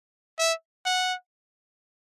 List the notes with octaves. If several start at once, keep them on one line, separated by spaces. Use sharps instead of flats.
E5
F#5